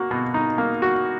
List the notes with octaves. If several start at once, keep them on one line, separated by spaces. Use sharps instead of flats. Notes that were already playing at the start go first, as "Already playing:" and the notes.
Already playing: A#3 F#4
B2
D#4
A#3
F#4